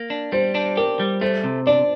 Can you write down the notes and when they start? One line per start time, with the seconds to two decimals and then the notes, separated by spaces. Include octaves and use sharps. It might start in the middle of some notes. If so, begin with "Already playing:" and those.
Already playing: A#3
0.10 D4
0.32 G3 C5
0.55 D4
0.77 G4 A#4
1.00 G3
1.21 A3 C5
1.44 C3
1.67 D4 D5